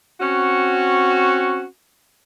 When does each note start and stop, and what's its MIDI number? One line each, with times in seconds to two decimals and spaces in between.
0.21 1.65 60
0.21 1.65 61
0.21 1.65 66